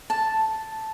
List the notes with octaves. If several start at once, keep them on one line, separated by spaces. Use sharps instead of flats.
A5